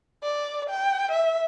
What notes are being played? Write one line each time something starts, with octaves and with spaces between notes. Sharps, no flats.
D5
G5
E5